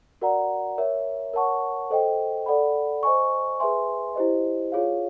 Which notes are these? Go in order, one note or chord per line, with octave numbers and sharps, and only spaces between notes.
F#4 A#4 D5 F#5 A#5
A#4 C#5 E5
A#4 C#5 F#5 A5 C#6
A4 C5 D#5 G5
A4 D5 F#5 B5
C5 D#5 G#5 C#6
G#4 B4 E5 G#5 C6
E4 G4 C5 D#5
F4 G#4 C#5 F5